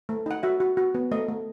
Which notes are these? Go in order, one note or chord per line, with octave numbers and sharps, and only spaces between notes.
A3
D#4 F#5
F#4 E5
F#4
F#4
B3
A3 D#5
A3